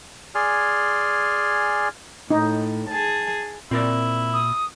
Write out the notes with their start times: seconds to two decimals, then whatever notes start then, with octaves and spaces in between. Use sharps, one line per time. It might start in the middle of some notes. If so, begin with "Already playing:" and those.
0.35 G#4 D5 G#5 C6 F6
2.30 A2 D#4
2.89 G#4 A5
3.71 A#2 C4 E4 A#4 D5
4.33 D#6